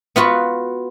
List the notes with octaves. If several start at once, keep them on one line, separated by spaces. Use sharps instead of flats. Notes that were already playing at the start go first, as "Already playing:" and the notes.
B3 F4 F#4 B4